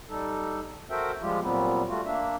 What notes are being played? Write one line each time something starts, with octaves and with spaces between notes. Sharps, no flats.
G3 D#4 A4
F#4 A4 A#4 C5 E5 G5
F3 G3 G#3 F4 G4
A#2 F#3 G3 B3 C4
G3 A3 F4 F#4
A#3 D4 E5